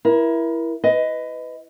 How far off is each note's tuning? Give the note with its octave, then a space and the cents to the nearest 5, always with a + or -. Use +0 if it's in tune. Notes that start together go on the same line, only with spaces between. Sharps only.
E4 +10 A#4 +30
B4 +20 D#5 +10